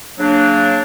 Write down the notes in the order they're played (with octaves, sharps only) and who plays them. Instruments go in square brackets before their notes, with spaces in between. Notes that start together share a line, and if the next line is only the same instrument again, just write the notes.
[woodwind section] C#3 F#3 A#3 D4